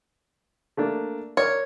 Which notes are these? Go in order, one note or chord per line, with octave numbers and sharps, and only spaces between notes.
A3 A#3 D4
A#4 C#5 D5